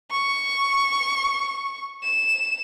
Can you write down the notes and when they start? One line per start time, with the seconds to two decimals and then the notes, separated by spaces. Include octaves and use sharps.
0.11 C#6
2.03 E7